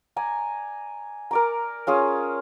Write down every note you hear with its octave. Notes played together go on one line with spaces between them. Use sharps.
D5 G#5 A#5
A#4 D5 A#5
C#4 F4 G#4